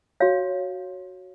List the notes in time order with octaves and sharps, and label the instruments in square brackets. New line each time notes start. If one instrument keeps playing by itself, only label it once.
[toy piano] F#4 C#5 F5